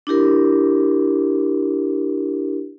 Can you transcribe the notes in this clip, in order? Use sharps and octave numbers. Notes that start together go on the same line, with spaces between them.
D4 E4 G4 A#4